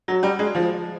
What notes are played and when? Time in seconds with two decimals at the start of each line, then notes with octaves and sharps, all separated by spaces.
0.08 F#3
0.23 G3
0.39 G#3
0.55 F3